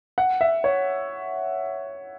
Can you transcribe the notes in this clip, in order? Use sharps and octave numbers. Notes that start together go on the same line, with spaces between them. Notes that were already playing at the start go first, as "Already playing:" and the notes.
F#5
E5
C#5